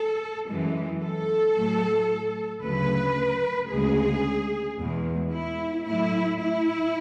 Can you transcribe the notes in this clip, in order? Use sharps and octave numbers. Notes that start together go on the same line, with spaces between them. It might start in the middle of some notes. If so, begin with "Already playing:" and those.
Already playing: A4
F#2 E3 G#3
A4
A2 F#3 A3
D2 C#3 F#3 B4
D2 C#3 G#3 G#4
E2 B2 G#3
E4
A2 F#3 A3 E4
E4